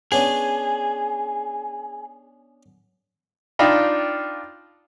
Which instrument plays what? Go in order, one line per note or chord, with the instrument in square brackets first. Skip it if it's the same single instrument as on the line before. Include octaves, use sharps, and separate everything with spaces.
[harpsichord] B3 C#4 D4 [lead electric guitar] G#4
[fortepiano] D4 D#4 F4 G5 B5